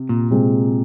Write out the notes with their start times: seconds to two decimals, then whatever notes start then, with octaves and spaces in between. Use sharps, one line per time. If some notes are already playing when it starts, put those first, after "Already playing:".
Already playing: C3
0.09 A#2
0.31 C3 G#3 C4 G#4